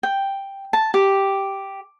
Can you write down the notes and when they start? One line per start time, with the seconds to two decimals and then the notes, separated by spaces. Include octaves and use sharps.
0.03 G5
0.73 A5
0.94 G4